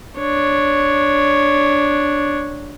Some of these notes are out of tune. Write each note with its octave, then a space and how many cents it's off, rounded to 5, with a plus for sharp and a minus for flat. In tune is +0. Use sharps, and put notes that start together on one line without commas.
D4 +0 C#5 +0